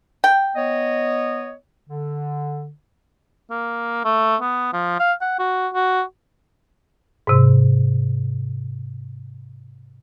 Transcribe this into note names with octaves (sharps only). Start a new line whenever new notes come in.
G5
B3 C#5 D#5
D3
A#3
A3
B3
F3
F5
F#5
F#4
F#4
G#2 C3